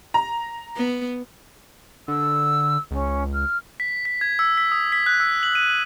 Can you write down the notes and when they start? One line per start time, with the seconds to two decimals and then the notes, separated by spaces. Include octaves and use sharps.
0.14 A#5
0.77 B3
2.08 D3 E6
2.91 C#2 C#4
3.33 F6
3.80 B6
4.05 B6
4.21 G#6
4.39 E6
4.58 B6
4.72 D#6
4.92 B6
5.06 F#6
5.20 E6
5.43 F#7
5.55 D#7
5.69 F#7